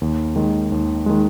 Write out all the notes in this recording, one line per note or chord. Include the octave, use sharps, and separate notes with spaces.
D#2
D#3 G#3
D#2
D#3 G#3